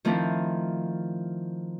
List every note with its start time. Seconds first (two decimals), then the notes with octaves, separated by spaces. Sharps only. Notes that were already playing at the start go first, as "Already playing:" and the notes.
0.05 D#3 F3 A3 C4 D4 E4